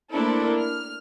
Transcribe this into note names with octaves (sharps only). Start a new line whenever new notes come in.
A3 A#3 D4 E4 A4 C5
F6